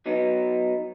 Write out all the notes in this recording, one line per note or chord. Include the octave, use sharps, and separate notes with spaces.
F#3 B3 D#4